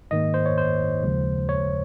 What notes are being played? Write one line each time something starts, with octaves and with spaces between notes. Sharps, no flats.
G#2 D#3 A#3 D#5
C5
C#5
C5
D#2 C#3 F3 G#3
C#5